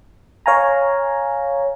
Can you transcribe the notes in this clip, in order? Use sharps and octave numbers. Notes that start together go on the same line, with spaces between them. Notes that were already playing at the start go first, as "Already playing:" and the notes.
C#5 F5 G#5 A#5